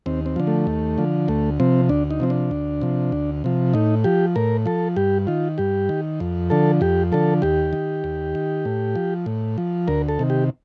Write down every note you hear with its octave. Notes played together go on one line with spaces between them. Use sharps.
D#2 C4
C4
D3 F3
A3
D#2
D3 F3
D2 A3
C3 F3 C4
D2 D4
D#4
C3 F3 C4
D4
D2
C3 F3
D2
C3 F3
A2 D#4
F3 G4
A2 A#4
F3 A4
G2 G4
D#3 F4
G2 G4
D#3
F2
D3 F3 A4
F2 G4
D3 F3 A4
D#2 G4
D#3
D#2
D#3
A2
F3
A2
F3
D2 A#4
A4
C3 D#3
G4